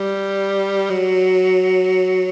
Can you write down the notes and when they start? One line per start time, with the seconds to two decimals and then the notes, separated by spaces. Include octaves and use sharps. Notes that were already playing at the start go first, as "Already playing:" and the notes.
Already playing: G3
0.91 F#3